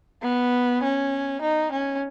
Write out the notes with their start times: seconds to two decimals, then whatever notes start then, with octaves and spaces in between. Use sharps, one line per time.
0.22 B3
0.83 C#4
1.42 D#4
1.72 C#4